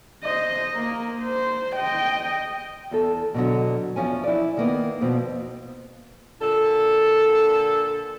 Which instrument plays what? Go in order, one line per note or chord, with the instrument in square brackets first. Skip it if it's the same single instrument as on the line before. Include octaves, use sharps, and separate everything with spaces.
[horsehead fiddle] C5 D#5
A#3 A#4
C5
D#5 G5
[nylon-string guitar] E2 A4
B2 D3 F#3
E2 F3 C#4 G#5
E4 D5
D#3 A#3 B3
F2 B2 C4
[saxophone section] A#2 D3 A4